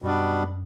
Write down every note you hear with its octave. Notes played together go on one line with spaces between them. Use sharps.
F#2 B2 G3 B3 D4